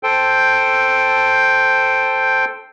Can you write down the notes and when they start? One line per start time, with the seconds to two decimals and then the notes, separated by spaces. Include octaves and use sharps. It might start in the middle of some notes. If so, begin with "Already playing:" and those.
0.03 A4 C5 G5